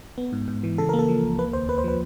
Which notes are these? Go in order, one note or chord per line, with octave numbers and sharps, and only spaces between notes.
B3
G#2
G#2
E3
C#3 A4
A#3 A#4
A4
F3
C#2
A#3 B4
D#2 C5
A#3 B4
C5
F3 B4